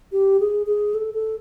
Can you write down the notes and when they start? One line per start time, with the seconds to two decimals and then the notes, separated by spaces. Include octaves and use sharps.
0.12 G4
0.40 G#4
0.66 G#4
0.94 A4
1.14 A4